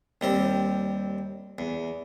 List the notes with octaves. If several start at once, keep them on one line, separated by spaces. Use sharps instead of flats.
D#2 G3 C4
E2